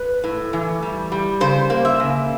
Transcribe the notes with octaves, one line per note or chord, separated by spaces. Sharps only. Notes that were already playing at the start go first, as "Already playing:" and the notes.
Already playing: B4
A2
E3
G3
G3
C#3 C5
A#3
E5
C#3